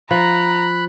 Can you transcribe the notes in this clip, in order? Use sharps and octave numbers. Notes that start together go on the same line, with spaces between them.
F3 A#5 B5 F#6